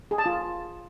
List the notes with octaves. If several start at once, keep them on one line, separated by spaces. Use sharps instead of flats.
G#4
A5
F4